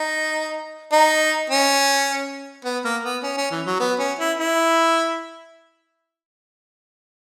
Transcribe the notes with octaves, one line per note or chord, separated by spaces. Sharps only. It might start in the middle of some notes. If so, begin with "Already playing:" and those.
Already playing: D#4
D#4
C#4
B3
A#3
B3
C#4
C#4
E3
F#3
B3
C#4
E4
E4